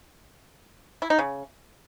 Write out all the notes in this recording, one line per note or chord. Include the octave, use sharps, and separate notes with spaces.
E4
D#4
C#3